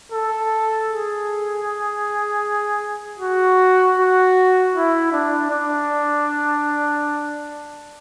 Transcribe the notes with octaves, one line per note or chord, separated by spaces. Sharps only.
A4
G#4
F#4
F#4
E4
D4
D4